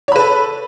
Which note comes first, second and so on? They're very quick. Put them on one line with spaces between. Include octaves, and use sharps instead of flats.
C#5 B5 B4 A4